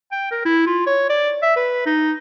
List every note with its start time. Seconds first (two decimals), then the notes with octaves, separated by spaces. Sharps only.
0.12 G5
0.31 A#4
0.45 E4
0.66 F4
0.87 C#5
1.10 D5
1.42 E5
1.56 B4
1.86 D#4